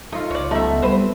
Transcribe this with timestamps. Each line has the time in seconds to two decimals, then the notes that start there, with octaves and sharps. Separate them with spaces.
0.12 A3 D#4 F4
0.30 C#2 C#5 D5
0.51 F#3 A3 B3 D#4 E5
0.82 G3 C4 B4 C5